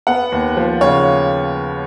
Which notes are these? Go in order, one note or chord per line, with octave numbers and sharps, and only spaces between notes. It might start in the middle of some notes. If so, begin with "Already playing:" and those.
B3 F#5
D#2
F3
C#3 C#5